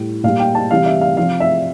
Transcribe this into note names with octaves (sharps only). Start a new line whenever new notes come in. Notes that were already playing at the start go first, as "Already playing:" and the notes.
Already playing: A2 G3
A#2 G3 F5
G5
A5
C3 E3 G3 F5
E5
F5
C3 F3 F5
E5